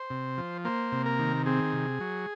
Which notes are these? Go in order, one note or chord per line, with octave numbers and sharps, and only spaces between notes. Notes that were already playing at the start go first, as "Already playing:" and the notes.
Already playing: C5
C3
F3
A#3 C5
C3
A#4
D#3
C4 G#4
C3
F#3